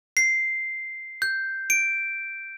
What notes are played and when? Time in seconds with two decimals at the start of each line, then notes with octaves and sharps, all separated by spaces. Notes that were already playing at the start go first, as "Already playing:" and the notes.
0.17 C7
1.22 G6
1.70 D7